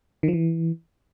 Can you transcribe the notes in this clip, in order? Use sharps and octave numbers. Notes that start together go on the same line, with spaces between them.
D#3
F3
E3